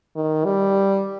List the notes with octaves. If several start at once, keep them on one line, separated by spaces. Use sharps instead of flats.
D#3
G3